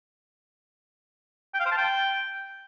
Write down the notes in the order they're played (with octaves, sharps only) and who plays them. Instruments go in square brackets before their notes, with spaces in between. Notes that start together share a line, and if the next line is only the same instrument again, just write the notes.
[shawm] G5
F5
C5
A5
G5